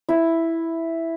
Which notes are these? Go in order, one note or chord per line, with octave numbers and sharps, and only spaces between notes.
E4